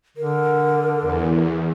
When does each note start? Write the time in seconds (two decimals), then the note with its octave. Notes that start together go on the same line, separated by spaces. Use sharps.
0.17 D3 A#4
1.02 E2